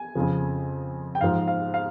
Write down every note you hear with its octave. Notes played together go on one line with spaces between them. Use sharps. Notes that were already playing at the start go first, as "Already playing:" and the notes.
Already playing: G#5
F2 C#3 F3
G5
G#2 F3 F5
F5
F5